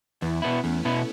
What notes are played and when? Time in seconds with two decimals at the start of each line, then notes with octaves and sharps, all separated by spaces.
0.21 E2 B3 E4
0.42 B2 B3 E4
0.63 E2 A3 C#4
0.85 B2 B3 E4